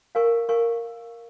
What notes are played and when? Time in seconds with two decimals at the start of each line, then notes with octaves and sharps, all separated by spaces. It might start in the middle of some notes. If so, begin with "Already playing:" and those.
0.15 A#4 F5 G#5 C#6
0.49 A#4 F5 G#5 C#6